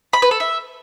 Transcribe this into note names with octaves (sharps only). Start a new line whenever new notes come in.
B5
B4
A4
E5